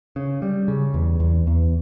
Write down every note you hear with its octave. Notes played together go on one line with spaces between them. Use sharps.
C#3
G3
C#3
E2
E2
E2